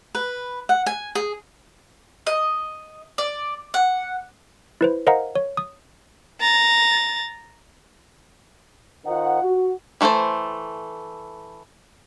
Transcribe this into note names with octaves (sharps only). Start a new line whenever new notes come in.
B4
F#5
G#5
G#4
D#5
D5
F#5
E4 B4 C5
A#4 C5 D#5 F5 F#5 A#5
C#5
D#6
A#5 A6
D#3 D#4 F4 C5 F#5
F#4
E3 A3 F#4 A4 C5